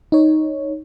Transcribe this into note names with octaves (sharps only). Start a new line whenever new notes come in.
D#4 C#5